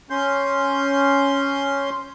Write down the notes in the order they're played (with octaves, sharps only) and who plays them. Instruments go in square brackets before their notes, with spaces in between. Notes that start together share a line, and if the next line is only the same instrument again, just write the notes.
[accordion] C#4 C6 G6